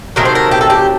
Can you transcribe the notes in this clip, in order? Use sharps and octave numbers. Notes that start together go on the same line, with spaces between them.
C3 D#3 F#3 A3 A#4
C5
A#4
G4
A4
G4